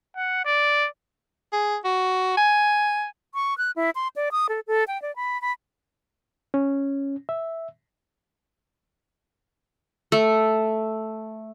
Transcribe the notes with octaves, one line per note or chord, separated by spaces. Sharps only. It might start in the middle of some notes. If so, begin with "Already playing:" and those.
F#5
D5
G#4
F#4
G#5
C#6
F#6
E4
C6
D5
D#6
A4
A4
G5
D5
B5
B5
C#4
E5
A3